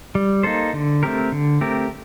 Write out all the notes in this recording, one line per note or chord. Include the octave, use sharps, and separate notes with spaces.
G3
A#3 D#4 A4 C5
D3
A3 C4 G4 A#4
D3
A3 C4 G4 A#4